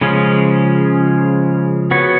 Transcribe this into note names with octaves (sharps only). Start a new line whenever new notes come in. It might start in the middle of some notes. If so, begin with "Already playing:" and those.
C#3 F3 G#3 C#4
B3 F#4 C#5